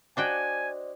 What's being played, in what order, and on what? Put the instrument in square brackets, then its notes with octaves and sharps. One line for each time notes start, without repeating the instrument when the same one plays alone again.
[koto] D4 F#4 G5 [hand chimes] C5 D5 D#5 [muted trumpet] G#5